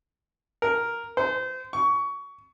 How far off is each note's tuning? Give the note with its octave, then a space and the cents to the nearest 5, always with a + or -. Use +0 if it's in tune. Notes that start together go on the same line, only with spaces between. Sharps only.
A#4 +0
C5 -30
C#6 +20